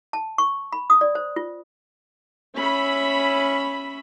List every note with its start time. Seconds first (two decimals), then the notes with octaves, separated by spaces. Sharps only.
0.13 A5
0.38 C#6
0.72 B5
0.90 D#6
1.01 D5
1.15 C5
1.36 F4
2.55 C#4 E5 B5